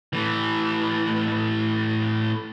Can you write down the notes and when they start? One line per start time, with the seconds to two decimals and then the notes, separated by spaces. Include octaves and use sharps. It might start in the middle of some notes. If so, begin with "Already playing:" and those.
0.13 A2 E3